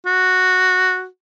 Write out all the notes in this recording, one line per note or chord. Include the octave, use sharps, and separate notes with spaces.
F#4